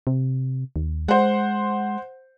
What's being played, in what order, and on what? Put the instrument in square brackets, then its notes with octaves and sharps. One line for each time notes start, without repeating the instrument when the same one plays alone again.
[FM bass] C3
D#2
[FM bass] G#3 [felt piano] C5 F#5